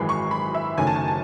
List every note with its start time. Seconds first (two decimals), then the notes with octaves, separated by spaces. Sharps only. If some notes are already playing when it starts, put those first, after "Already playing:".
Already playing: G#1 F#2 E3 G#3 B5
0.09 C#6
0.31 B5
0.54 E5
0.77 F#1 F#2 D#3 A3 C#4 G#5
0.87 A5
0.96 G#5
1.08 A5